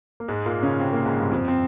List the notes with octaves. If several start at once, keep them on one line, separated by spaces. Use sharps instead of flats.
A#3
G#2 G#3
A#2 A#3
C#3 C#4
C3 C4
A#2 A#3
G#2 G#3
G2 G3
F2 F3
C4